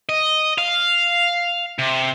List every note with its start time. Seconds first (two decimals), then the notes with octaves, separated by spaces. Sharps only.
0.09 D#5
0.58 F5
1.79 C3